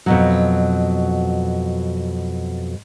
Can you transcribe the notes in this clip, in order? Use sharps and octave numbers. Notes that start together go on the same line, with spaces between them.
F2 B2 F#3